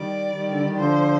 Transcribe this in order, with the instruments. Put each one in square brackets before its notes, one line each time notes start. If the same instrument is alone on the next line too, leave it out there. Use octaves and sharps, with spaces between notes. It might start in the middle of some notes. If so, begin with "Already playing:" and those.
Already playing: [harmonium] D#3 G3 [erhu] D5
[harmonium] D#3 G3
D3
D#3
[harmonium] D3 F3 [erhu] C5